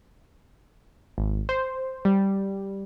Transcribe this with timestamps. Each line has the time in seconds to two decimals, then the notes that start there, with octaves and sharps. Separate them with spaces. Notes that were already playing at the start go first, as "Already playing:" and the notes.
1.18 G#1
1.49 C5
2.05 G3